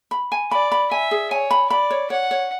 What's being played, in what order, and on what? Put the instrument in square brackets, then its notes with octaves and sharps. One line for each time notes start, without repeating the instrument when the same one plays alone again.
[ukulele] B5
G#5
[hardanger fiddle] D5 [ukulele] B5
[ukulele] B5
[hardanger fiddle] E5 [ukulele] G#5
[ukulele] G#4
[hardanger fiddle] C#5 [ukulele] G#5
[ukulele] B5
[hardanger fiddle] D5 [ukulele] B5
[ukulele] C#5
[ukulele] C#5 [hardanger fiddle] F#5
[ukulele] C#5